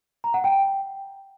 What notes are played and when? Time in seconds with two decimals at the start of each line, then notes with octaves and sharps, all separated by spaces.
0.24 A#5
0.34 F#5
0.44 G5